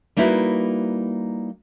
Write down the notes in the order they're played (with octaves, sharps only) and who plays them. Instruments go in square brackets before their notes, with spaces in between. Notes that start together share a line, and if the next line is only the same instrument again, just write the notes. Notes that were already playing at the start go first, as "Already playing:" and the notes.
[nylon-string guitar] G3 A#3 D#4 E4 F#4 B4